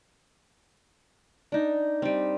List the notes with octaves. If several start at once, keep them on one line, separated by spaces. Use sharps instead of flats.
D4 D#4
G3 C4